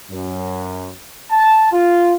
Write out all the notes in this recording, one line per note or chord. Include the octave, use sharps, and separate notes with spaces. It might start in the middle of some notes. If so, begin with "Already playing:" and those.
F#2
A5
F4